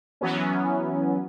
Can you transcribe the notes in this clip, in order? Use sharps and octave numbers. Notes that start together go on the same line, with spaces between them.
E3 F#3 B3 C#4